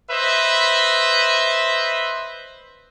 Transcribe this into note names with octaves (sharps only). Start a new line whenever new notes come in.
B4 C5 D#5 E5